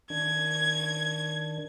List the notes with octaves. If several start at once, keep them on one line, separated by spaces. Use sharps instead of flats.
D#3 D4 G#6